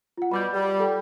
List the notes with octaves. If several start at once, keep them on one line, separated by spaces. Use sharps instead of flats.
F4 F#5
B2 G3 B5 D6 G6
G3
A4 G5 B5